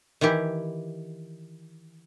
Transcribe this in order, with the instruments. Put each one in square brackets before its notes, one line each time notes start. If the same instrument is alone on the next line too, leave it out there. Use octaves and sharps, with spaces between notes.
[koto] D#3 E3 E4 G4